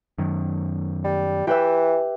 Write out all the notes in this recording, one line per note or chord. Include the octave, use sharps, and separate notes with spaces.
F#2 D#3
G3
E3 G4 B4 E5